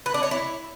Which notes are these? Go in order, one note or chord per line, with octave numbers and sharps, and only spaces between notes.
B4
D4
C#5
E4